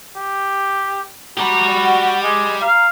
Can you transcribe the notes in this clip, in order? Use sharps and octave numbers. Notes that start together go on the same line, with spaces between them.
G4
F#4 G4 A#5 B5
F#5
G#3 D#5
F5 A#5